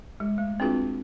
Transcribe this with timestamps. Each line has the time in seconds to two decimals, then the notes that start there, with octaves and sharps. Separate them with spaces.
0.20 G#3
0.38 A3
0.60 C4 D4 F4 F#4 G#4 B4